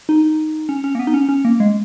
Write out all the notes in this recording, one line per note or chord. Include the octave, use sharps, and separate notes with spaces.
D#4
C#4
C#4
A#3
B3
D#4
C#4
C#4
A#3
G#3